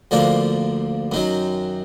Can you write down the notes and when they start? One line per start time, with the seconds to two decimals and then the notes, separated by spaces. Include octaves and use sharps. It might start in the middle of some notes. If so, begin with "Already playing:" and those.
0.11 D2 D3 F3 A#3 D4
1.12 F#2 D#3 F#3